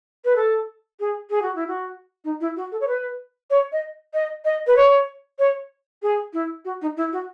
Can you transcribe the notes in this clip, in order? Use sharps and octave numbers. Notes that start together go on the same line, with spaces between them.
B4
A4
G#4
G#4
F#4
E4
F#4
D#4
E4
F#4
A4
C#5
B4
C#5
D#5
D#5
D#5
B4
C#5
C#5
G#4
E4
F#4
D#4
E4
F#4